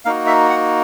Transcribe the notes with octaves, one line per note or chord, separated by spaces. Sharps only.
A#3 D#4 F#4 F5
E5
F#5